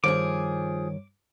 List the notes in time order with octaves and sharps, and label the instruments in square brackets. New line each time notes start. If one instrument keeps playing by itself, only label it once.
[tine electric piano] G2 G3 C#5 [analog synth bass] D#3 [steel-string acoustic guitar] F3 G#4 [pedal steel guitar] D6